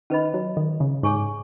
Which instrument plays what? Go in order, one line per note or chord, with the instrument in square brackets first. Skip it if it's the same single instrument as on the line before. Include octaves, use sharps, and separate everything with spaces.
[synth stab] D#3 [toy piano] C#4 B4 D#5 B5
[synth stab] F#3
D#3
C#3
[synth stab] G#2 [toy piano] G#4 C#5 G#5 C#6